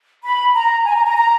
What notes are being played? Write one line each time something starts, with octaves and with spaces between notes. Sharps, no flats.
B5
A#5
G#5
A#5
A#5
A#5